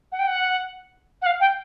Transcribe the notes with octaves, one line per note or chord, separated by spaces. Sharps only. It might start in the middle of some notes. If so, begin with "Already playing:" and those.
F#5
G5
F#5
F#5
F5
G5